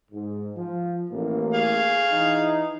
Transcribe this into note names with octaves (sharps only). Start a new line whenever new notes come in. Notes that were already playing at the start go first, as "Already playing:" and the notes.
G#2
F3
A1 A#3
G#4 F5
E3 D#4